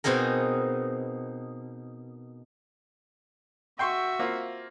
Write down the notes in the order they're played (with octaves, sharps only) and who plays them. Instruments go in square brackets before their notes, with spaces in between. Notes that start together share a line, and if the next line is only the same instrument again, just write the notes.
[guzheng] B2 C4 D#4 G#4 A#4
[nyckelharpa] F#4 E5 [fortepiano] G5 C6 C#6
[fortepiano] A#3 C4 F4